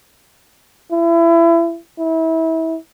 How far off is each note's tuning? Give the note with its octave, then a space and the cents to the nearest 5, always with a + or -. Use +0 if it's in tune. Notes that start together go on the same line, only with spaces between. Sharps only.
E4 +30
E4 -30